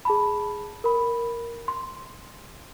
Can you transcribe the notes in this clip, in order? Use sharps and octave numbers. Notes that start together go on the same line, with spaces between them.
G#4 A5 B5
A#4 B5
C6